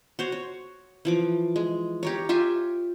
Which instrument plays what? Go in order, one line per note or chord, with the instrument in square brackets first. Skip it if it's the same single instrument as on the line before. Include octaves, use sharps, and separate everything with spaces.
[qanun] F#4 C5 C#5
C#5
E3 F3 D6
G#3
G4 A#4 C#5
F4 G4 E5 G#5